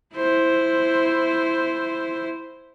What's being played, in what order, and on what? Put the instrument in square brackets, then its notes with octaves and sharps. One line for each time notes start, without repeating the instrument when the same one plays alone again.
[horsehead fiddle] E4 C5